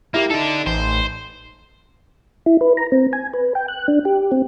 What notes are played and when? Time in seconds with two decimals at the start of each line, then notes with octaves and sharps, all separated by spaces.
0.14 A#3 E4 G4
0.30 D4 D#4 A4
0.66 A1 C5
2.46 E4
2.61 B4
2.77 A#5
2.92 C4
3.13 G#5
3.34 B4
3.55 G5
3.68 F#6
3.88 D4
4.05 G4
4.32 C4